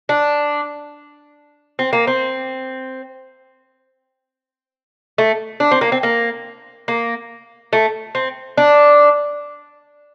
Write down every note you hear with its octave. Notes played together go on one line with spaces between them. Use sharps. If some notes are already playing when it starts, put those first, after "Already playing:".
D4
C4
A#3
C4
A3
D4
C4
A#3
C4
A#3
A#3
A3
C4
D4